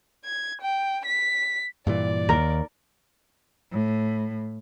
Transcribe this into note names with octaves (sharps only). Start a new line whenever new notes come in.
G#6
G5
B6
G2 A#2 E3 D5
D#2 A#4
A2